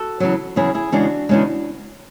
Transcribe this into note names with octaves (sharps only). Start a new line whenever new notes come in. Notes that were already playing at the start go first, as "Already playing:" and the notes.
Already playing: F#4 A4
E2 C#3 F#3
E2 C#3 F#3 E4 G#4
E4 G#4
E2 C#3 G#3 D4 F#4
E2 C#3 G#3